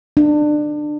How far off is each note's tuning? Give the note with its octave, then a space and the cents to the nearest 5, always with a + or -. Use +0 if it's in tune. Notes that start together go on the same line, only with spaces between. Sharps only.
D4 +25